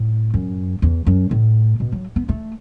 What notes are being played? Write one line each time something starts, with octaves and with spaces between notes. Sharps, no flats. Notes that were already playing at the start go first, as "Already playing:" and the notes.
Already playing: A2
F#2
E2
F#2
A2
B2
F#3
B3
A3